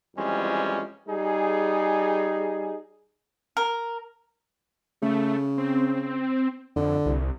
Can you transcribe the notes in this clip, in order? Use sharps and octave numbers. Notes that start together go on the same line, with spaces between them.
F2 E3 G3 G#3 C#4
G3 D#4 G#4
A#4
C#3 A3
C4
F2 D3
C2